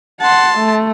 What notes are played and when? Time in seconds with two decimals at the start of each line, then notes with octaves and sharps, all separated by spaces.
0.21 F#5 A5 C6
0.58 A3